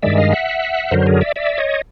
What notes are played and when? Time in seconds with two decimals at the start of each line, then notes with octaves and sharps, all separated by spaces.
0.02 G2 D#3 G#3 D5 E5
0.18 D#5 F5
0.32 E5 F#5
0.91 F#2 D3 F#3 A#4 C5
1.06 G#4 A#4
1.21 D5 E5
1.36 D5 E5
1.58 C#5 D#5